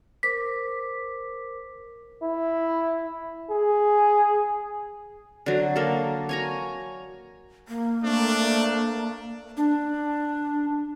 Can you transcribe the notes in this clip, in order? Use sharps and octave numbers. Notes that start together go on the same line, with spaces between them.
A#4 C5 D6 B6
E4
G#4
D3 F#3
A#3 A4
C#5 G#5 A#5
A#3
A3 C4 D4
D4